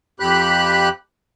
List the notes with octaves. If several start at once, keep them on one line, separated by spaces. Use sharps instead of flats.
F2 G4 B5 F#6